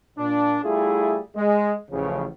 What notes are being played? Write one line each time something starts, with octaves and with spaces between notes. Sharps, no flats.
A#2 D4
G3 A3 E4 F4 G#4
G#3
A1 C#3 F3